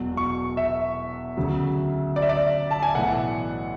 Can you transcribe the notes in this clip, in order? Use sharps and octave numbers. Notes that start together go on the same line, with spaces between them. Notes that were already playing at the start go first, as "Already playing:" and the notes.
Already playing: E1 E2 B2 F#3
C#6
E5
D2 C#3 F#3
D5
E5
D5
A5
G#5
B1 A2 E3 F#5